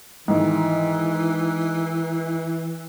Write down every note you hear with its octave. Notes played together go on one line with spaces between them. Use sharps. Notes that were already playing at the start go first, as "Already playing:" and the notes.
G#2 D#3 E3